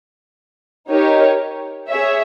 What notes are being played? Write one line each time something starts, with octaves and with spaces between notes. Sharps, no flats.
D#4 G4 A#4 C#5
G#4 C#5 E5